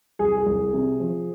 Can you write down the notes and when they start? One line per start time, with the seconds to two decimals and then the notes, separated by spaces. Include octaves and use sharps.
0.19 C2 G#4
0.37 G#4
0.46 C2
0.73 C3
1.00 F3